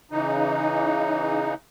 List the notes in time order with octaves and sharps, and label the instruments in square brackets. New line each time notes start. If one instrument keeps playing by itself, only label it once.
[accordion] C#3 E3 D#4